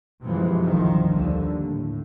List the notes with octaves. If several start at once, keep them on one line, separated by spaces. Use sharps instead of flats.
F#2 C3 E3 F3 G#3
G1 C2 D#3 F3
D#2 D3
A2